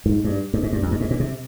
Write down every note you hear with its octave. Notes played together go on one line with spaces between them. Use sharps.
G#2
G2
G2
G#2
G2
F2
G2
G#2
A#2
C3